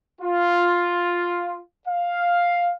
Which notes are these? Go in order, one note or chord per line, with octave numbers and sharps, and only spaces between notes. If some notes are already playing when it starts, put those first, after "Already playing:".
F4
F5